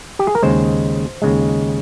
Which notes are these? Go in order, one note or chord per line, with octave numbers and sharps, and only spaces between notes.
G4
G#4
A#4
D#2 C#3 G#3 C5
D#2 C#3 G#3